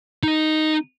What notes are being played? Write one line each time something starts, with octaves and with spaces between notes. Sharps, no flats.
D#4 D#5